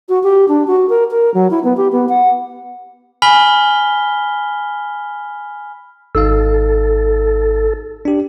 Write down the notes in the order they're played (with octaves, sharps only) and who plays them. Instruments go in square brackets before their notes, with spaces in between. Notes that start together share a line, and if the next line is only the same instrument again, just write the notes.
[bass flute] F#4
G4
D4
F#4
A#4
A#4
F#3
E4
B3
G4
B3
F#5
[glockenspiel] G#5 B5 F6 B6 G7
[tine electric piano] G#1 D#4 F5 [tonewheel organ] A4
[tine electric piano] D4 G4